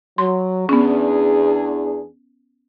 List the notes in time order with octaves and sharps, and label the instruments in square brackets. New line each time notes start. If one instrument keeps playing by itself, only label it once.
[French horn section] F#3 [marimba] C6
[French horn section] E2 D4 G#4 [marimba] B3 C#4